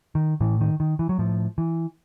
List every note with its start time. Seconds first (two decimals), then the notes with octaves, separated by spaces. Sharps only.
0.15 D#3
0.41 A2 E3
0.61 D#3
0.80 D#3
0.99 E3
1.09 F#3
1.19 A2 F3
1.58 E3